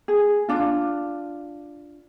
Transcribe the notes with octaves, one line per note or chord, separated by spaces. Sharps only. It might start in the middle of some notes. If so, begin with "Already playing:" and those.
G#4
D4 F4